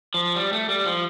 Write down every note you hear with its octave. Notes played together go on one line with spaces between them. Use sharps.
F3
G3
A3
G3
F3